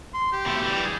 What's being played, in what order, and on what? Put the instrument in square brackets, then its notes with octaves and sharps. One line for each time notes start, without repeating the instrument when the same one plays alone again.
[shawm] C6
G4
[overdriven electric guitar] B2 A3
E3 G3
[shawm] G#4